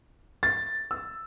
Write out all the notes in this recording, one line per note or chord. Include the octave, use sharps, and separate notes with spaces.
A6
E6